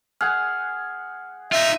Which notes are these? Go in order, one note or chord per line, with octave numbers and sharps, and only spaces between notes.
G#4 F#5 G#5 F6
D#4 F4 E5